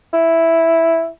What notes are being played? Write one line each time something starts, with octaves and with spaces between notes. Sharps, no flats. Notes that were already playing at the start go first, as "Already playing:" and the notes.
E4